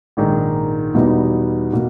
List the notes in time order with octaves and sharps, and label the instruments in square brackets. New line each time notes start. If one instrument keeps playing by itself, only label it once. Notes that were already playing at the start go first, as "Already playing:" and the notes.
[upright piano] A#1 G#2 D#3 G#3 D#4
E2 B2 G3 B3 D#4
B2 A#3